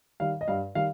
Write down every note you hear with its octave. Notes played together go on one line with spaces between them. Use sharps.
D#3 G3 F5
D#5
G2 F5
D#3 G3 F5